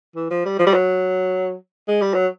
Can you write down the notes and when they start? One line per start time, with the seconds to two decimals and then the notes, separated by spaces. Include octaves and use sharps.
0.16 E3
0.30 F3
0.45 G3
0.59 F3
0.67 G3
0.74 F#3
1.88 G#3
2.01 G3
2.14 F#3